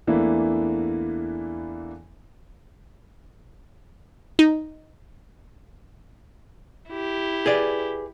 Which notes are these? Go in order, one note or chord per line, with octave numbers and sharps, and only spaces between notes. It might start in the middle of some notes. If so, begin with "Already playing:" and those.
E2 E3 A3 A#3 D4 E4
D#4
E4 G4
G#4 B4 D5